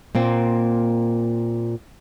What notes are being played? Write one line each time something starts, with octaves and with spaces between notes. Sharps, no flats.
A#2 A#3 C4